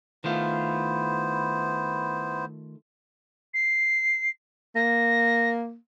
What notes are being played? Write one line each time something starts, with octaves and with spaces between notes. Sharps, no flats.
D#3 A3 B3 E4 F4 C5
C7
A#3 A#6